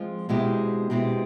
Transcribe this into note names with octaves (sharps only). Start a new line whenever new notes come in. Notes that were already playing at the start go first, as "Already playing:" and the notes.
Already playing: F3 G#3 C4 F4
B2 G#3 C4 E4 G4
B2 G#3 C4 E4 G4